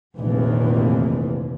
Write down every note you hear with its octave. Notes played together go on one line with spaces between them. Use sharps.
F1 A#1 D#2 D#3 E3